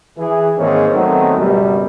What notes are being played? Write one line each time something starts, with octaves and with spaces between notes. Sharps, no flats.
E3 G#4
G#2 D#3 A#3 C4 C#4
D#3 F#3 A3 B3 C4 D#4
C#2 F#2 B2 G3